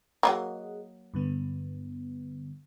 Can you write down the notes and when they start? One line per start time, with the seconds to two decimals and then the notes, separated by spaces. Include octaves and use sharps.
0.23 F#3 A3 A#3 G#4 D#5 F#5
1.14 G2 D3 B3